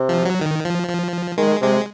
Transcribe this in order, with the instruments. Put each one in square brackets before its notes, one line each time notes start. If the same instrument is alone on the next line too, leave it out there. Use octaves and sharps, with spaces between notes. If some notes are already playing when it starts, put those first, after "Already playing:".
Already playing: [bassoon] C3
[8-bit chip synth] F3
F#3
D#3
F3
F3
[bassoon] D#3 [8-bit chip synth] G#3
[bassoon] C3 [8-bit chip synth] G#3